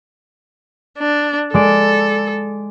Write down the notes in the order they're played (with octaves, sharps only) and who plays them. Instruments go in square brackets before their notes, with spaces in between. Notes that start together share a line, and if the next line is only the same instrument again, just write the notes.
[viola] D4
[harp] G#3 D5 [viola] A4